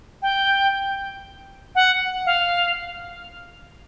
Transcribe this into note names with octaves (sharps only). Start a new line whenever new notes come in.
G5
F#5
F5